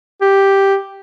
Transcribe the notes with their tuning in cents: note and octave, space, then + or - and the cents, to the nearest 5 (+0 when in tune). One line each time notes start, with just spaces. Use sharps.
G4 +0